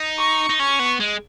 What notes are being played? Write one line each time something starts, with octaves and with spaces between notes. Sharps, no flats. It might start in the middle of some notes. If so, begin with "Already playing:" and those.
Already playing: D#4
C#6
D#4
C#4 C#6
B3
G#3